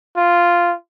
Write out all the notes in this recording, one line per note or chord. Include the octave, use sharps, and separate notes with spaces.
F4